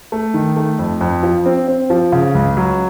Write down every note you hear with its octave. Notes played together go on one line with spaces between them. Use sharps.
A3
D#3
A3
F2
F2
F3
C4
C4
F3
C#3
C#2
F#3